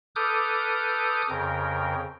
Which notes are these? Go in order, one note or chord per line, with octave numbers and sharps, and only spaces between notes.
A4 B4 D6 D#6 F6 G6
F2 C#3 A#4 G5